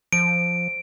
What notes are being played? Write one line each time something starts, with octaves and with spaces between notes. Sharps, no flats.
F3 D7